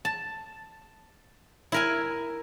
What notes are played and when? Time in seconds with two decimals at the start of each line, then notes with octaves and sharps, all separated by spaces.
0.05 A5
1.72 E4 A#4 G#5